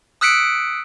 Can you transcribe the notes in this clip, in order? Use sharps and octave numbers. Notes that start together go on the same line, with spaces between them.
D#6 E6 F#6 B6 C#7 D7